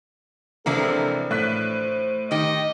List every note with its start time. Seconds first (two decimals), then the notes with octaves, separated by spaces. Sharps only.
0.66 C3 E3 F3 G#3 A#3 D4 A4 A#4
1.31 A2 C5 F#6 B6
2.31 D#3 G4 D#5